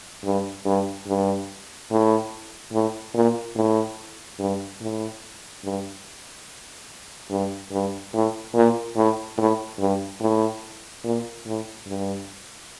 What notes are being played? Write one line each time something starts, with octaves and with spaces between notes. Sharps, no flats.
G2
G2
G2
A2
A2
A#2
A2
G2
A2
G2
G2
G2
A2
A#2
A2
A2
G2
A2
A#2
A2
G2